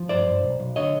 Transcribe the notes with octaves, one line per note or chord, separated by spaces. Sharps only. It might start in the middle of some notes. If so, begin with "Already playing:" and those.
Already playing: F3
G2 C5 D5
G2
B1
B1
D3 C#5 D#5